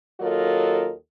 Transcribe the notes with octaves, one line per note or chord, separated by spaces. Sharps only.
D#2 F#3 F4 A4 A#4 D#5